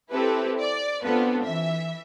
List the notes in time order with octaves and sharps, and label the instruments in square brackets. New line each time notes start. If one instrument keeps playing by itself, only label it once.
[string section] C4 E4 G4 A4 B4
D5
B3 C4 D4 F4 A4 B4
E3 E5